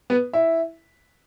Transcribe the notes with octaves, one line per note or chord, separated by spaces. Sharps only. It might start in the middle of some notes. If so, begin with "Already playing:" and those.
B3 B4
E4 E5